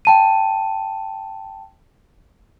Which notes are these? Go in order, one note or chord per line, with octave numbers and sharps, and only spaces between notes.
G5 A5 D#7